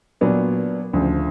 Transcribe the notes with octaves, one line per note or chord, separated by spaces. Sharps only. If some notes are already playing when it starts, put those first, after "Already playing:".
A#2 F#3 B3 D4
D2 C#3 F3